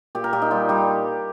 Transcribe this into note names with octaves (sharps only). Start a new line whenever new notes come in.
A#2 G4
A#4
A#2 G4
D#4
G3 F4
G3 G4